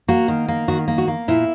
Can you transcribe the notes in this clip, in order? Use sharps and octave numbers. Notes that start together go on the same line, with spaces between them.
A#3 F#4
D#3
A#3
D#3 F#4
A#3
F#4
A#3
A#2 E4